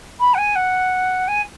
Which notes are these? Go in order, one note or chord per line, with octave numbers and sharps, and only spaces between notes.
B5
F#5
G#5
F#5
G#5